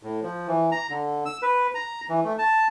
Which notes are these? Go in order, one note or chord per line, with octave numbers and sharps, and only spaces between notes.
A2
F3
E3
A#5
D3
E6
B4
A#5
E3
A3
A5